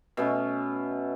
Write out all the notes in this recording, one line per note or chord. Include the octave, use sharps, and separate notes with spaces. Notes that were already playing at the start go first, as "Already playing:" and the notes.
B2 A3 B3 C#4